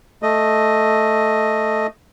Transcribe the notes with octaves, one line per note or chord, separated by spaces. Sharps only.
A3 D#5